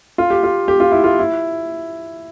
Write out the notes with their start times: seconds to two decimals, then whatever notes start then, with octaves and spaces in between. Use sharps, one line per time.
0.18 F4
0.30 G4
0.43 F4
0.68 G4
0.80 F4
0.92 E4
1.04 F4
1.19 E4